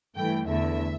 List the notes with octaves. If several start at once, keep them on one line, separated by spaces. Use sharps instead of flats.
G2 E3 A3 G5
E2 D3 A3 E5